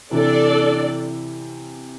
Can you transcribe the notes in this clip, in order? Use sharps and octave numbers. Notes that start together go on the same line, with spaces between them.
C3 E3 D4 A4 D5